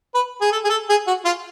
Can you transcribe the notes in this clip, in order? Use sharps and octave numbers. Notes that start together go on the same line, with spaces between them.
B4
G#4
A4
G#4
A4
G#4
F#4
F4